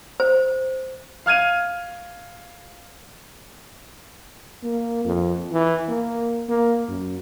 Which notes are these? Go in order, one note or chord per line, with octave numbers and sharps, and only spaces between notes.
C5
F5 F6 G#6 D#7 F7
A#3
F2
E3
A#3
A#3
F#2